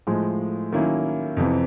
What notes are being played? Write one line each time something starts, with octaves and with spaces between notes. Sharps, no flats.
A2 F3 G#3
D#3 F#3 A#3 C#4 E4
F2 C3 E3